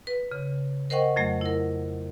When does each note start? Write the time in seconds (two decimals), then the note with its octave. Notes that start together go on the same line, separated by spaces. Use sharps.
0.07 B4
0.31 C#3
0.90 A#4 C5 D#5 F#5 G5 C#6
1.16 F2 F#3 A3
1.41 E4 A#4